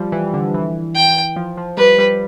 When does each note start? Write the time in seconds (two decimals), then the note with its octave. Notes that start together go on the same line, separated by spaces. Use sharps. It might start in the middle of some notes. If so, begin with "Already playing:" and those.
Already playing: F3 G3
0.12 E3
0.34 D3
0.54 E3
0.95 G5
1.36 F3
1.57 F3
1.77 G3 B4
1.98 G3